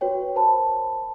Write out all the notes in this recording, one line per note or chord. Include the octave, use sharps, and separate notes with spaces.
F#4 B4 C#5 G5
A#4 C5 A5 B5